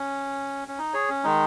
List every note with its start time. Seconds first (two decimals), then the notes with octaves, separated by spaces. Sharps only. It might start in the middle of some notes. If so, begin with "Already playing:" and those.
Already playing: C#4
0.68 C#4
0.78 D#4
0.94 G#4 C#5
1.09 C#4
1.24 D#3 G#3 D#4